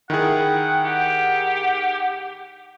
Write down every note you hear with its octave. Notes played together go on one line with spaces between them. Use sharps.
D#3 E4 G#4 F#5 G5
G4 F#5